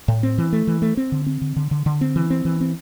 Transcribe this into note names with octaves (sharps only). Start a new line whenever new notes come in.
A2
C4
E3
A3
E3
A3
C4
D3
C4
D3
D3
D3
D3
C4
E3
C4
E3
C4